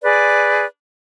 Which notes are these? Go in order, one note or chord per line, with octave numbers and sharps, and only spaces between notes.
G#4 B4 D5